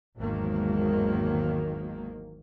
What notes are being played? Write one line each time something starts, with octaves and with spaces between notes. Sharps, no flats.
G#1 E2 G#2 D#3 F#3 A#3